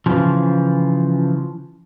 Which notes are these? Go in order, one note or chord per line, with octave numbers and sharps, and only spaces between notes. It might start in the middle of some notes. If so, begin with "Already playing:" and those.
C#3 E3 F3